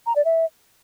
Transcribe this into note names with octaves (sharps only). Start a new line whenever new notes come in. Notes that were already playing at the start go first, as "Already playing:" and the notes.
A#5
D5
E5